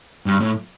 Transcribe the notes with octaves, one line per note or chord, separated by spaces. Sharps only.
G2
A2